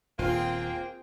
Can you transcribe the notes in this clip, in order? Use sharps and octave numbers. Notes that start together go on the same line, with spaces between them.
D#1 A#3 C4 F4 G#4 G5